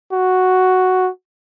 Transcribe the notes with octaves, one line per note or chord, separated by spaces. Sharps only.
F#4